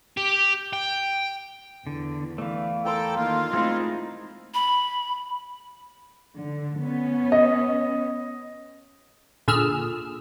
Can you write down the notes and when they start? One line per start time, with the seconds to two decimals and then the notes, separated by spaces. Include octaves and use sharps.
0.17 G4
0.73 G5
1.87 E2 D3
2.38 E3 A3 D5 F5
2.85 A4 A#4 G5 A#5 C6
3.15 D#3 A#3 F4
3.53 G#3 A3 C4 D#4 E4 A#5 C6
4.54 B5
6.38 D3
6.80 B3 C#4
7.32 D#5
9.48 A#2 D3 G#4 E6 F6